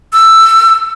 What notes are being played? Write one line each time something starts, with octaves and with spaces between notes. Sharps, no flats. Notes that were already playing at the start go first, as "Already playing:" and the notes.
E6